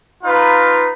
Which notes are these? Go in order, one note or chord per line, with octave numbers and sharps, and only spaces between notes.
D#4 F4 B4 F5 A#5